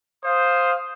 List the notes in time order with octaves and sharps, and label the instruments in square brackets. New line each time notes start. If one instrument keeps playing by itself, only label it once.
[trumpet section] C5 F5 D#6